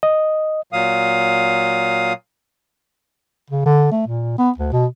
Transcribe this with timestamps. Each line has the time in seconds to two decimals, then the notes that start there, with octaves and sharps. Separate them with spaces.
0.03 D#5
0.73 A#2 F#3 F5 D#6
3.50 C#3
3.66 D3
3.91 A3
4.07 A#2
4.38 B3
4.58 D2
4.72 B2